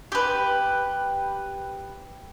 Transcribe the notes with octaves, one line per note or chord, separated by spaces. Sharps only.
G4 B4